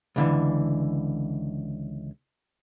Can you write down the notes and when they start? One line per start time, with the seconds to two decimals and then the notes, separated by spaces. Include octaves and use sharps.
0.16 C#2 D3 E3